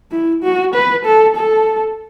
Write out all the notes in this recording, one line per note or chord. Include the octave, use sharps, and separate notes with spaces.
E4
F#4
B4
A4
A4